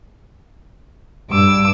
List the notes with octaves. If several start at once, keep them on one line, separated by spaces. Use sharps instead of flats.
G2 D6 E6